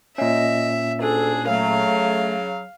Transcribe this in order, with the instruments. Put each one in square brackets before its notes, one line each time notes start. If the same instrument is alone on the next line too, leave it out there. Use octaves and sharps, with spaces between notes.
[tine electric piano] A#2 C#4 [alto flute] D#5 [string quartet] E5
[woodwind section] D2 D4 [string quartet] G#4 [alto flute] A4
[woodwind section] C#3 F#3 [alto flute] A3 [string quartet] F5